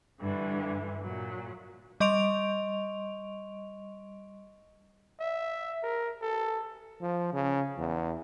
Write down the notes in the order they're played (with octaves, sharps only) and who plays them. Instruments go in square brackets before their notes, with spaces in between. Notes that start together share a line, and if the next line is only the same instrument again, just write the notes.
[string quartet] G2 D3 E3
A#2 F#3
[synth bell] G3 D#5 C6 C#6 D7 F7
[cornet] E5
A#4
A4
[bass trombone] F3
C#3
E2